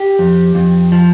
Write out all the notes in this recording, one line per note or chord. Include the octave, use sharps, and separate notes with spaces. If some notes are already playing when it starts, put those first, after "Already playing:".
Already playing: G4
F2
F2
F3